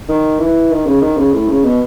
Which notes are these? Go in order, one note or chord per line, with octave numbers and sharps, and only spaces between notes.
D#3
E3
D#3
C#3
D#3
C#3
A2
C#3
B2